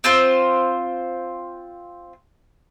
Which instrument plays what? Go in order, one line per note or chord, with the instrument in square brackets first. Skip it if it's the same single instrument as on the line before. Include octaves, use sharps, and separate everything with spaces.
[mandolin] C4 F4 C5